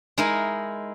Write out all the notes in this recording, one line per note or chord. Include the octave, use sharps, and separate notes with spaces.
G#3 D#4 E4 A#4